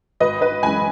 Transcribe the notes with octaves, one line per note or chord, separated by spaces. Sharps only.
G#1 B4 D#5
B4 D#5
F#2 E3 G#3 G#5 B5